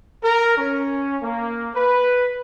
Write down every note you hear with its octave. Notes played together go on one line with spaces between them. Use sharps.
A#4
C#4
A#3
B4